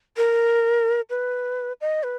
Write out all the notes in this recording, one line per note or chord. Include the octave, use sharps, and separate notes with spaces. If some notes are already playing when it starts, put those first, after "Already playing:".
A#4
B4
D#5
B4